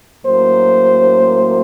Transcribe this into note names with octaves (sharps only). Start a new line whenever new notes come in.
A2 F#3 A#3 C#4 C5